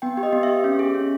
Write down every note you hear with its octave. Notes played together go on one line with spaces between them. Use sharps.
B3 G5
G4
D#5
B3
E5
G4
C#4
G#4
C#4